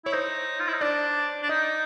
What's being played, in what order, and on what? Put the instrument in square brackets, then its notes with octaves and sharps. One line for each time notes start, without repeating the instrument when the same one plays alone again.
[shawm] E4 [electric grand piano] C#5
[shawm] D#4 [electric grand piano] C5
[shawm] F4
E4
D#4
[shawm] D4 [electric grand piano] D5
[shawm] D4
[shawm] D#4 [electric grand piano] D#5